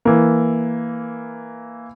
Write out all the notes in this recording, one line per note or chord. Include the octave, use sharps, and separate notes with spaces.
E3 A#3